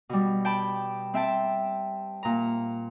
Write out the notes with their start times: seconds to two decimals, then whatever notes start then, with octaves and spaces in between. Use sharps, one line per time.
0.09 B2 G3
0.45 G5 A5 B5
1.14 C4 E5 G5 A5
2.23 A#2 A#5